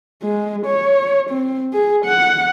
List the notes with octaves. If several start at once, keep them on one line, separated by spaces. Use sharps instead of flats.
G#3
C#5
C4
G#4
F#5